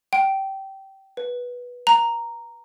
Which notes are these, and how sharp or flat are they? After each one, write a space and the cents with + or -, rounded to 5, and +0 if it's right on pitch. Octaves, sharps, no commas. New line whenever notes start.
G5 -20
B4 -10
A#5 -5